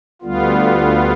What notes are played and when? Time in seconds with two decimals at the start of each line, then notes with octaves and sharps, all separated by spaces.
0.22 D2 D3 G3 B3 F4